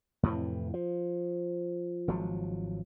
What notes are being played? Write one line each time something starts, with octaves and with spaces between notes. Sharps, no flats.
F2 A2 C3 E3
F3
G#1 F3 F#3